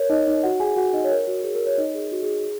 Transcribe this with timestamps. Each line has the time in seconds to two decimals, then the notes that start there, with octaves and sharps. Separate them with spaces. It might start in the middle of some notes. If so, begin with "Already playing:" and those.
Already playing: A#4 C#5
0.10 D#4 D#5
0.27 D#4 D#5
0.43 F#4 F#5
0.60 G#4 G#5
0.76 F#4 F#5
0.93 D#4 D#5
1.04 C#5
1.11 A#4
1.27 F#4
1.44 G#4
1.55 A#4
1.66 C#5
1.78 D#4 D#5
1.94 G#4
2.12 F#4
2.23 G#4
2.33 G#4